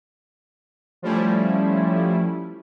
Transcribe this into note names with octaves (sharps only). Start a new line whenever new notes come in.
F3 G3 A3 C#4 E4